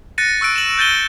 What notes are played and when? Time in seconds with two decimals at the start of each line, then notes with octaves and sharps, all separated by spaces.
0.18 F#6 A6 A#6 C#7 D#7
0.41 C#6 E6 F#6 D7
0.56 E7 F#7
0.78 F#6 G6 A6 D#7 G7